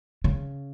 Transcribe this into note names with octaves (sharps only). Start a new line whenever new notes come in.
C#3